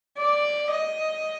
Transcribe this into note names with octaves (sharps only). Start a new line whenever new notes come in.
D5
D#5